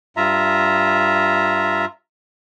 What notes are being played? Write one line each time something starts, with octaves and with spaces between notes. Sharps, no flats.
G2 F4 E5 A#5